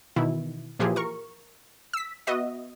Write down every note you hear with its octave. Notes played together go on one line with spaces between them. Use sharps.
B2 D#3 E3 E4
A#2 E3 F3 G4 G#4
A#4 C#6
E6 B6
B3 F#4 D#5 E5